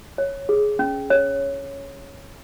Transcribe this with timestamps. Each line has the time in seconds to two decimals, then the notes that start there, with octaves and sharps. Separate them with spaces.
0.18 C#5
0.49 G#4
0.79 C#4
1.10 C#5